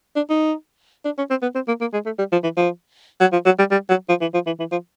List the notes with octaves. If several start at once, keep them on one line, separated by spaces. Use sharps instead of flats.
D4
D#4
D4
C#4
C4
B3
C4
A#3
A#3
G#3
A3
G3
F3
E3
F3
F#3
F3
F#3
G3
G3
F#3
F3
E3
F3
E3
E3
F3